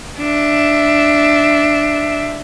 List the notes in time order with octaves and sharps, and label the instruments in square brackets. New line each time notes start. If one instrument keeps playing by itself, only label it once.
[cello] D4 E5